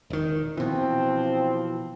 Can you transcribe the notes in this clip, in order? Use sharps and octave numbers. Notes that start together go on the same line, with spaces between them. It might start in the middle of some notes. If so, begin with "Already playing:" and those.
E1 D#3
B2 E3 F3 C4